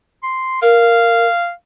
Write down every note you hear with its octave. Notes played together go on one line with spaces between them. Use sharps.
C6
A#4 F5